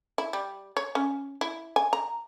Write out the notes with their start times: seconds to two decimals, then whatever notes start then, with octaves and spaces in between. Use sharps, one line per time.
0.18 E4
0.33 G3
0.77 C#5
0.95 C#4
1.41 E4
1.76 G#5
1.93 A#5